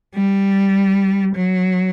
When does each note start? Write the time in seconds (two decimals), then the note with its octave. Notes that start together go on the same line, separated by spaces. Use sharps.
0.15 G3
1.35 F#3